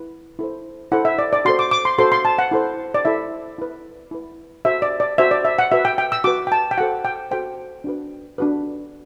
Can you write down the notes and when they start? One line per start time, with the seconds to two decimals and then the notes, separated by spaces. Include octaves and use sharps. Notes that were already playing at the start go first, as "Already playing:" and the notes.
Already playing: E4 B4
0.39 E4 A4 C5
0.92 E4 A4 C5 F#5
1.05 E5
1.19 D5
1.33 D5
1.45 F#4 A4 C5 C6
1.59 D6
1.71 D6
1.85 C6
1.98 F#4 A4 C5 C6
2.12 C6
2.25 A5
2.39 F#5
2.51 E4 A4 C5
2.95 D5
3.05 E4 A4 C5 E5
3.58 E4 B4
4.11 E4 B4
4.65 F#4 C5 E5
4.82 D5
5.00 D5
5.18 F#4 C5 E5
5.31 D5
5.45 E5
5.59 F#5
5.71 F#4 B4 E5
5.85 G5
5.98 G5
6.12 E6
6.24 F#4 B4 D6
6.47 G5
6.52 A5
6.71 G5
6.78 F#4 A4 C5 F#5
7.05 G5
7.31 F#4 A4 C5 G5
7.84 D4 F#4 B4
8.38 D4 F#4 B4